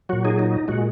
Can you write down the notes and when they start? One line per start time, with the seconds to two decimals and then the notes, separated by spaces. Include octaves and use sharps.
0.09 A#2 F#3 F#4
0.25 D#4 G#4
0.39 D#4
0.68 A#2 G#3 F#4